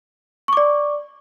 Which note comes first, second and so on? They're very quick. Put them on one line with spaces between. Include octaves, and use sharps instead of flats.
C#6 D6 D5